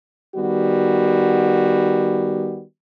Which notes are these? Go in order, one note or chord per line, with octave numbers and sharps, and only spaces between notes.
D#3 G3 B3 F#4